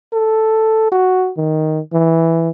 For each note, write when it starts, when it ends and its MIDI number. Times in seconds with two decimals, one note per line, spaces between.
0.13 0.87 69
0.92 1.31 66
1.37 1.80 51
1.93 2.50 52